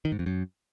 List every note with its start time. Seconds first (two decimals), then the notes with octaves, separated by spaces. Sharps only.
0.05 D#3
0.12 G#2
0.19 F2
0.26 F#2